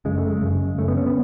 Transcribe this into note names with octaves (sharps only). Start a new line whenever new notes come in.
F#2 C#3 G#3
A3
G#3
F#2 C#3
F#2 C#3 A3
B3
C#4
B3